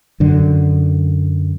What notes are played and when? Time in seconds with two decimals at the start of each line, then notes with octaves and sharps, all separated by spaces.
0.20 F#2 D3